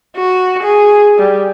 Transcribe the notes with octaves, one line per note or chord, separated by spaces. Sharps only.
F#4
G#4
G3